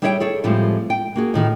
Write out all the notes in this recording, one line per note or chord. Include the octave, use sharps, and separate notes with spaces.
G3 E4 G#4 C#5 E5 G5
G#4 A4 C#5
A2 F3 G3 G#3 C4
G5
A#3 F#4 G#4
A2 D#3 E3